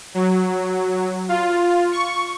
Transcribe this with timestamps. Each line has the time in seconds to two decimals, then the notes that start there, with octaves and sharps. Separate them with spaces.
0.14 F#3
1.29 F4
1.92 C#6